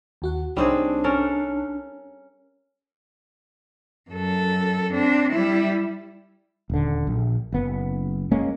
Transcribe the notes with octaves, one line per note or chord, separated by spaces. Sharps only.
D#2 F#4 F#5
C2 G3 C4 D4 D#4 G#4 C#5
C#4 A4 A#4
F#2 A4
C4 D4
G3 E4
D#1 D3
A#1
F#1 B3
G#3 A#3 C#4